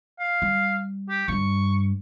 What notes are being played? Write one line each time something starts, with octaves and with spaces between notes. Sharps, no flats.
F5
G3
G4
G2 G3 C#6